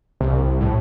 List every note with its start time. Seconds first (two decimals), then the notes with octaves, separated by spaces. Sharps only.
0.21 C2
0.60 A2